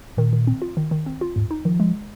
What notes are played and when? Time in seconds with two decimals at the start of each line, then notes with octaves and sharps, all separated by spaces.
0.17 A#2 D#3
0.33 D#3
0.47 C4
0.62 F4
0.77 D#3
0.91 D#3
1.06 C4
1.21 F4
1.36 D#2 G#2
1.51 D#4
1.65 D#3 F3
1.80 G#3